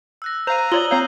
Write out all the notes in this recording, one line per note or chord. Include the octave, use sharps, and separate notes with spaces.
E6 F#6 A#6
C5 F5 A#5 D#7 F7
F4 C#5 D5 D#6 F#7 G7
C4 C#5 F5 A#5 G6 C7